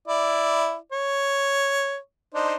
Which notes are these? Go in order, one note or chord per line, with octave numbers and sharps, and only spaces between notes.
E4 D5
C#5
D4 D#4 C5